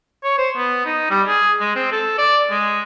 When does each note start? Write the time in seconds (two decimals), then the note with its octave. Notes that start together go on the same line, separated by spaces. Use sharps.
0.24 C#5
0.38 C5
0.56 B3
0.85 D#4
1.10 G3
1.27 G#4
1.60 G#3
1.75 C4
1.92 A4
2.18 D5
2.50 G#3